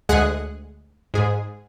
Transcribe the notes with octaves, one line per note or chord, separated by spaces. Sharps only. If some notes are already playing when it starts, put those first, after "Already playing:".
D2 G#3 G#4 F#5 F#6
G#2 G#4